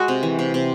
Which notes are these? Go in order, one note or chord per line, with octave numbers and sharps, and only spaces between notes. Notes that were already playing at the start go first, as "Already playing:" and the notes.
Already playing: G#3 F#4
C3
E3
C3
C3